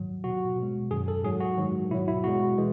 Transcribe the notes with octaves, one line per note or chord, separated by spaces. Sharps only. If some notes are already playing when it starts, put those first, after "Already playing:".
Already playing: G#2 D#3 F#3
B2 F#3 F#4
B2
G#3
F#2 D#3 F#3 G#4
A4
G#2 F#3 G#4
F#4
G#2 D#3 F#3
B2 F#3 E4
E4
B2 G#3 F#4
E3 G#3